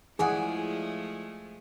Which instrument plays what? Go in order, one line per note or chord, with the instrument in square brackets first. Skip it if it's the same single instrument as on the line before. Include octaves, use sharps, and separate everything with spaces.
[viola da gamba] F3 G#3 A3 [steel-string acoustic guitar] E4 F4 D5 [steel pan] G#4 F#5